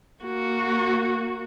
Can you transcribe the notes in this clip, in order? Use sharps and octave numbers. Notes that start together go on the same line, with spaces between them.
A#3 F#4